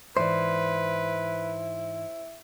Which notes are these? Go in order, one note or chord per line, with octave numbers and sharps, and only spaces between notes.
G#2 E3 E4 B4 C5 D5